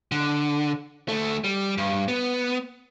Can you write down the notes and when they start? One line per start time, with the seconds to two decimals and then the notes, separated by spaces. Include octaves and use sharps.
0.12 D3
1.09 D2 A3
1.44 G3
1.78 G2
2.08 B3